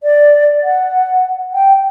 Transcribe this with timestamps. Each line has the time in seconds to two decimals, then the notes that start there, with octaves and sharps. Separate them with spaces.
0.03 D5
0.63 F#5
1.54 G5